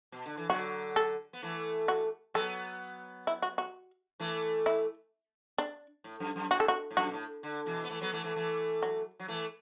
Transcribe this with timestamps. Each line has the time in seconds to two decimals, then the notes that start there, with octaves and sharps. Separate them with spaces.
0.12 B2
0.26 D3
0.37 E3
0.49 D3 F#3 F#4
0.96 A4
1.33 B3
1.42 E3 A3
1.88 F#4
2.34 F#3 B3 A4
3.27 E4
3.42 F#4
3.58 F#4
4.20 E3 A3
4.66 E4
5.58 D4
6.04 A2
6.20 F#2
6.36 F#2
6.51 A2 F#4
6.60 A4
6.68 F#4
6.91 A2
6.97 F#2 F#4
7.07 B2
7.13 A2
7.43 D3
7.66 B2 E3
7.84 B3
7.89 E3 A3
8.01 F#3 B3
8.13 E3 A3
8.24 E3 A3
8.36 E3 A3
8.83 F#3
9.19 F#3
9.28 E3 A3